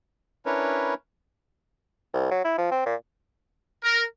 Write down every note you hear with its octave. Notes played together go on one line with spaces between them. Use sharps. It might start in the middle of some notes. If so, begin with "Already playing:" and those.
C#4 D4 E4 A#4 B4 C#5
C2
F#3
E4
F3
C4
A#2
A#4